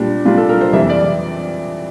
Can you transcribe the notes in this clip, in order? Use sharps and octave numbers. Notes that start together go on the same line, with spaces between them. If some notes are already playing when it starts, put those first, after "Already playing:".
Already playing: A#2 G3 D4
A#2 G3 D4 F4
A4
A#4
C5
F2 E3 G3 E5
D5